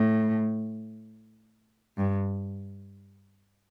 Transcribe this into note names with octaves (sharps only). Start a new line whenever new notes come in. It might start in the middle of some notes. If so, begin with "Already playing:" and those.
Already playing: A2
G2